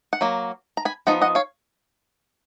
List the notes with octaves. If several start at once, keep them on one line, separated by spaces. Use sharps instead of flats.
F#5
F#3 A#3
A#5
G#5 B5
F3 B3 D#4 F#5 A#5
D#5 F#5
C#5 F5